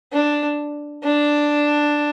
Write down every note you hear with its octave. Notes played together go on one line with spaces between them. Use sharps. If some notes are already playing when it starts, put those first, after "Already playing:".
D4
D4